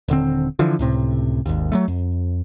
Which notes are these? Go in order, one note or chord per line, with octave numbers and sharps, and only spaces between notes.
D#1 D3 C4
D3 E3 F3
C#2 A2 C3
G#1 D#2
F#3 G#3 A3
F2